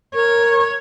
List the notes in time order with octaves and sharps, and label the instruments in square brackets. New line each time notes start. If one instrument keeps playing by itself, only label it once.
[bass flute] A#4 [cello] C#5